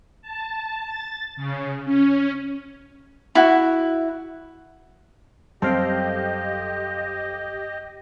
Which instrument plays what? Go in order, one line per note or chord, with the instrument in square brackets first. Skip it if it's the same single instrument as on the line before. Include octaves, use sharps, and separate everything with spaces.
[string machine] A5
A6
C#3
C#4
[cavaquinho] E4 F#4
[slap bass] F#2 G3 [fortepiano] C4 [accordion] G4 D#5 [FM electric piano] A4 F5 G5